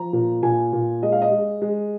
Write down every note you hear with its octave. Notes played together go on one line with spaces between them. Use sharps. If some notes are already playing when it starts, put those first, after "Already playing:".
Already playing: F3 A#5
A#2
A#2 G#5
A#2
G#3 D#5
F5
D#5
G#3
G#3